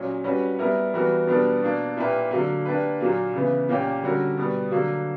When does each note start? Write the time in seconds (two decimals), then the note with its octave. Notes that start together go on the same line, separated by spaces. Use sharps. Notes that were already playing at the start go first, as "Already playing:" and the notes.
Already playing: A#2 F#3 C#4
0.24 G3 C#4 F#4 B4
0.59 G3 B3 E4 A#4
0.94 E3 G3 B3 F#4 A#4
1.27 B2 G3 B3 D4 A#4
1.61 B2 A#3 D4
1.97 A#2 A#3 E4 G4 B4
2.31 D3 F#3 A#3
2.66 A#3 D4 G4 B4
3.00 A#2 F#3 A#3
3.34 C#3 E3 B3
3.69 A#2 A#3 C#4 G4
4.03 D3 G3 C#4 F#4 A#4
4.37 B2 G3 B3
4.72 D3 F#3 A#3